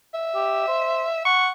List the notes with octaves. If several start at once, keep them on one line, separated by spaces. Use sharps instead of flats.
E5
G4
C5
F#5 C#6